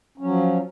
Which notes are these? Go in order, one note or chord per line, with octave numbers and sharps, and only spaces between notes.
F3 F#3 C#4